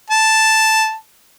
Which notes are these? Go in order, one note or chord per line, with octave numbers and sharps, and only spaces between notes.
A5